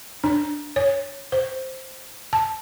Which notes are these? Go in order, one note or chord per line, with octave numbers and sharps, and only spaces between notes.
D4
C#5
C5
A5